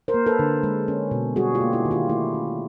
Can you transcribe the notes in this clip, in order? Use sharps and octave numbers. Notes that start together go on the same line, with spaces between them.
A#4 C5
A#3
A4 B4
D3
G#3
C#4
B2
G3 F#4 G#4
F4 G4
A#3
E4 F#4
D#3
F4 G4
A3 E4
C#4